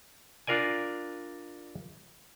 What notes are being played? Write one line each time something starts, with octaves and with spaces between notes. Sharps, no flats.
D4 F4 A#4 D5 G#5